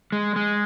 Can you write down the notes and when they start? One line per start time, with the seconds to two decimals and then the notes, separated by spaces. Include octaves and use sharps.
0.12 G#3
0.36 G#3